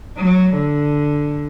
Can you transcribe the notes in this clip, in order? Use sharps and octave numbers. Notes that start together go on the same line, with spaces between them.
F#3
D3